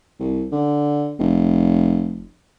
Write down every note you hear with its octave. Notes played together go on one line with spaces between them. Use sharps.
C2
D3
F1